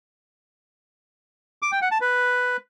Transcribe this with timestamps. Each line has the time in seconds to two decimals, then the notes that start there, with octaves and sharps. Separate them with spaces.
1.62 D6
1.72 G5
1.82 F#5
1.91 A5
2.01 B4